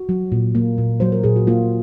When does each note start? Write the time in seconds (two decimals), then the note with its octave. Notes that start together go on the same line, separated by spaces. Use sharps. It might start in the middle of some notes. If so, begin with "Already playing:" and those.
Already playing: F#4
0.09 F#3
0.32 A#2
0.55 A#3
0.78 A#2
1.00 F#3 C5
1.12 A#4
1.24 A#2 G#4
1.36 F#4
1.47 A#3 F4